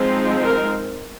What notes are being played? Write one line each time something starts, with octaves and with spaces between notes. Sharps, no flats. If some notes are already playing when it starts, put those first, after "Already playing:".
Already playing: F3 G#3 C4 D#4
A#4